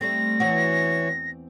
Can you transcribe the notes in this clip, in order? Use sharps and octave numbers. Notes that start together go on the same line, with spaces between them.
G3 A3 C4 A#6
E2 E3 C4 F#4 C#5